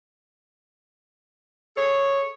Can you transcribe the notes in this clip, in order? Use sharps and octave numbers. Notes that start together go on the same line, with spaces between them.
G#4 A4 C#5